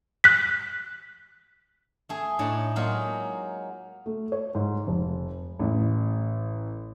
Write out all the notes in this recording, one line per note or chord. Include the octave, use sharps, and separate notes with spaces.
F#6 B6
A3 G#4
A2 D4 D#4 C#5 D5 A5
F#3 G#3 A#3 D#4 F4
A3
C#5
G#2
F1
A1